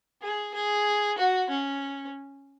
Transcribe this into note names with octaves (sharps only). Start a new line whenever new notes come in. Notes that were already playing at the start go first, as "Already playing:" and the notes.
G#4
G#4
F#4
C#4